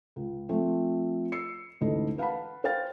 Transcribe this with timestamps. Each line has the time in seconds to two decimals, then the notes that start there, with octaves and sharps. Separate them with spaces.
0.16 C#2
0.49 F3 A3 C4 F4
1.32 E6 C7 C#7
1.81 A1 D2 G#2 A4 D#5
2.18 B4 F5 F#5 A5 B5
2.64 C5 F5 G5 F6 A6